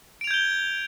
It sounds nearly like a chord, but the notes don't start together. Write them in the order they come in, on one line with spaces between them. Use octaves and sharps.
D7 F7 G#6 G6 G7